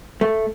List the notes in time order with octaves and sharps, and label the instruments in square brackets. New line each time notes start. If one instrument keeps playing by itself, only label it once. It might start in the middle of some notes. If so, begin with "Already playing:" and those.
[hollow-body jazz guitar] A3